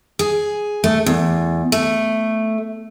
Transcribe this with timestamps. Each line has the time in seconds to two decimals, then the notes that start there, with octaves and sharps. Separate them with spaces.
0.19 G#4
0.84 A3
1.06 E2
1.72 A3